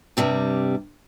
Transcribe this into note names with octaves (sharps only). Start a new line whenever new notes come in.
G2 C3 G3